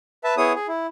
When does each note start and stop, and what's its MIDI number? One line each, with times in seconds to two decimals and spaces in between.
0.24 0.35 71
0.24 0.35 76
0.24 0.35 81
0.37 0.53 59
0.37 0.53 64
0.37 0.53 68
0.37 0.53 73
0.37 0.53 87
0.55 0.67 68
0.68 0.87 64